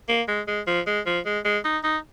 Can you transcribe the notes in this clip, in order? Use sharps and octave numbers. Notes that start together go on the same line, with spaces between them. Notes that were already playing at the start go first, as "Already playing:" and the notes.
A#3
G#3
G#3
F3
G#3
F3
G#3
G#3
D#4
D#4